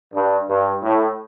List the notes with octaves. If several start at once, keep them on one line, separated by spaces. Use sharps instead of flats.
G2
G2
A2